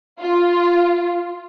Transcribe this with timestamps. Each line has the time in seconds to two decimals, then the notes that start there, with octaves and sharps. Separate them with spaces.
0.20 F4